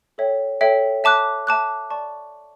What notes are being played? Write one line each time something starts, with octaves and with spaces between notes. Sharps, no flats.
A4 C#5 E5 G5
A4 C#5 E5 G5
E5 A5 D6 F#6
E5 A5 D6 F#6
D5 A5 C#6